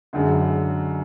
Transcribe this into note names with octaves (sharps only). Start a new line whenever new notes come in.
F#1 F#2 D3 G#3